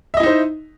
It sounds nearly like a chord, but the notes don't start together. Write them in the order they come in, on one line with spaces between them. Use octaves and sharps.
E5 D#5 E4 D#4 C5